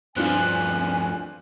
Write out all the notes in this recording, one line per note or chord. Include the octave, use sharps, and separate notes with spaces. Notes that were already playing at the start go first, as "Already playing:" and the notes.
G2 F3 C4 D4 F4 B4 G#5